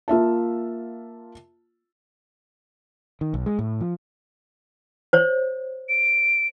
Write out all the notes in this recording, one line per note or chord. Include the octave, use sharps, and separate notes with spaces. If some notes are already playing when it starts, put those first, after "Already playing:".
A#3 F4 E5 A5
D#3
B1
G#3
A2
F3
C5 C#5
D7